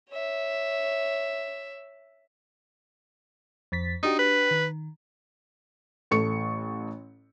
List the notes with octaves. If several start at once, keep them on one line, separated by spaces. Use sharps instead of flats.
C#5 E5
F2 A6 B6
D4 D#4 F#4 G4
B4
D#3
A1 A4 C#6 C#7